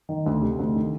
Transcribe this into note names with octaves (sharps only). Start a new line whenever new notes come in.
D#3
D2
C3
D2
D#3